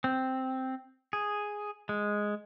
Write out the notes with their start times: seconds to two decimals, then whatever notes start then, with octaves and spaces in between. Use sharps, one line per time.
0.04 C4
1.13 G#4
1.89 G#3